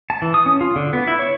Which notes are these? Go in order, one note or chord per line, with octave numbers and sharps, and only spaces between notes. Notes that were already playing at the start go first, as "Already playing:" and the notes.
A5
E3
D#6
C#4
F4
D3
B3
E4
C#5